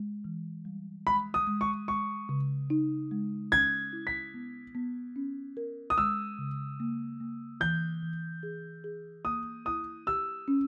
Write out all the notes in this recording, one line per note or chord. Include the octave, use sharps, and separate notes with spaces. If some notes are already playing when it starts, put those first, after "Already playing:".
Already playing: G#3
E3
G3
G#3 B5
D#6
G#3
C#6
G#3 C#6
C#3
D#4
G#3
C#4 G#6
E4
B6
B3
B3
C#4
A#4
D#6
G#3 E6
C#3
A#3
A#3
E3 G6
E3
G#4
G#4
A#3 D#6
E4 D#6
G4 E6
C#4